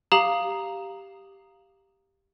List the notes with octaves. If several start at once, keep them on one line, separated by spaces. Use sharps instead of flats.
G4 F5 A#5 D#6 E7 F#7